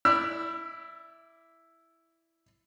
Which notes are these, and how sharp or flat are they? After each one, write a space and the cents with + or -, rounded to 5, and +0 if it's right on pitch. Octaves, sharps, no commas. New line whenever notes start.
E4 +0 D5 +0 E6 +35